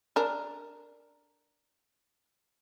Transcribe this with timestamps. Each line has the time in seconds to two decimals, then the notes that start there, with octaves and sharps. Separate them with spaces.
0.16 D4 A#4